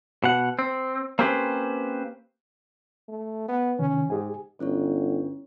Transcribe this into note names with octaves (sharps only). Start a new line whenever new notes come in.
B2 F#5
C4
A#3 C4 C#4 G4 B4 C5
A3
B3
C3 D#3 E3 C#4
G#2 G4 G#4 G#5
G1 C#4 E4 C#5